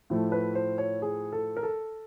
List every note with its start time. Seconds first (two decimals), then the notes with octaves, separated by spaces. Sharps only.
0.10 A2 F3 A3
0.32 B4
0.55 C5
0.78 C#5
1.02 G#4
1.32 A4
1.57 A#4
1.63 A4